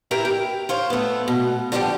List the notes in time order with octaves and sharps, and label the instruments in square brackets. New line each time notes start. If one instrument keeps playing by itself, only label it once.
[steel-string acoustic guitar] E4 G4 A#4 B4 E5 G5
G4
F4 C5 C#5
A3 B3
B2
D3 F3 G3 B3 D#4 G4